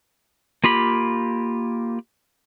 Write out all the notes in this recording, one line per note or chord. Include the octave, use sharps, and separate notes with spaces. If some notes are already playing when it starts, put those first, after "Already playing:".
A#3 F4 G4 B5